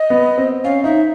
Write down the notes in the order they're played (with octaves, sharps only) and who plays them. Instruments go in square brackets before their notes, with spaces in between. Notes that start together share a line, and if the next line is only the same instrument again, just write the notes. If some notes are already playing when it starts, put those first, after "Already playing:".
Already playing: [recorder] D#5
[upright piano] B3
C4
[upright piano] C#4 [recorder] F5
[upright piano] D#4 [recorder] E5